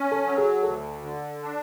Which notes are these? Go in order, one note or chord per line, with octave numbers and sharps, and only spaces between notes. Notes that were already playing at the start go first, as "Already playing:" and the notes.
Already playing: C#4
A4
F#3
G#4
D2 A4
D3
D4